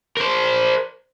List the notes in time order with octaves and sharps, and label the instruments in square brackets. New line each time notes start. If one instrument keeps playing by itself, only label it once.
[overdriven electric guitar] A#4 C5